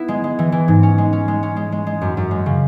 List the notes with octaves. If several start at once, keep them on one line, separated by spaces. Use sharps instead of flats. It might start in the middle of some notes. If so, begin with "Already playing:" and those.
Already playing: B3 E4
G#3
G#3
E3
E3
G#2
C#4
G#3
C#4
G#3
C#4
G#3
G#3
G#3
F#2
F#2
G#3
C#3